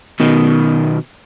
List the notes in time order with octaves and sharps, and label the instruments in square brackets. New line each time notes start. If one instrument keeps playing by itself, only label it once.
[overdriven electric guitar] B2 D#3